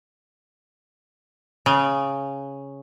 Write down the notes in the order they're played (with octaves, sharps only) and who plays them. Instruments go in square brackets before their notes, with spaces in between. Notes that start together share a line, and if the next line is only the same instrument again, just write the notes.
[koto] C#3